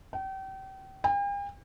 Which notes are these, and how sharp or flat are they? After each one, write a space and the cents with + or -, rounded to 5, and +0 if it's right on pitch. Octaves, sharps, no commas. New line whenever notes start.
G5 -35
G5 +45